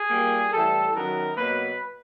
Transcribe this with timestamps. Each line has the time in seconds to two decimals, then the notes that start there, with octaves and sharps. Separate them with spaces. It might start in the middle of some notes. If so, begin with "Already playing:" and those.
Already playing: G#4
0.10 A#2 G3 A#3
0.52 A2 E3 G3 A4
0.95 F#2 D#3 F#3 B3 A#4
1.37 B2 F#3 A#3 B4